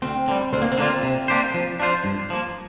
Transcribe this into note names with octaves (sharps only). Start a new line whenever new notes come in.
D2 C4
D3 G3
D2 C4
A#3
C4
D3 A#3 F4
C3
A#3 D4 G4 C5
F3
D4 F4 C5
G2
F3 A#3